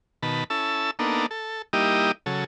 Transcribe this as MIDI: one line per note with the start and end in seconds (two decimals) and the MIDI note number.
0.23 0.44 47
0.23 0.44 51
0.23 0.44 81
0.23 0.44 83
0.50 0.91 61
0.50 0.91 64
0.50 0.91 69
0.50 0.91 81
0.50 0.91 88
0.99 1.26 58
0.99 1.26 59
0.99 1.26 62
0.99 1.26 63
0.99 1.26 69
1.31 1.62 69
1.73 2.12 55
1.73 2.12 58
1.73 2.12 63
1.73 2.12 64
1.73 2.12 67
1.73 2.12 75
2.26 2.44 49
2.26 2.44 54
2.26 2.44 69